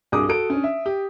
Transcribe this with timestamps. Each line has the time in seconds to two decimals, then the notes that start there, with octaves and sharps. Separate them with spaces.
0.12 C2 G2 F#4 G#4 D6 D#6
0.29 F#4 A4 D7
0.50 C#4 D4
0.64 E5
0.86 G4